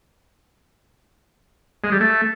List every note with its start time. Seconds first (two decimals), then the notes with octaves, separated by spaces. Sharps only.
1.84 G#3
1.92 G3
2.00 A3